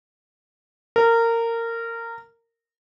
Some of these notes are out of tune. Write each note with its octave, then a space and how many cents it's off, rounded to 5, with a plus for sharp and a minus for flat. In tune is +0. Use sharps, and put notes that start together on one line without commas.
A#4 -20